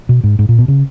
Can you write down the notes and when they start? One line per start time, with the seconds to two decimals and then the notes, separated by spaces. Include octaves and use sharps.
0.09 B2
0.24 G#2
0.39 G#2
0.49 A#2
0.58 B2
0.68 C#3